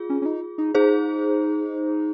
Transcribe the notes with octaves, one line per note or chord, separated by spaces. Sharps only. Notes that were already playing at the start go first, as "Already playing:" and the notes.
Already playing: F4 G#4
C#4
C#4
D#4
D#4
D#4 G#4 C5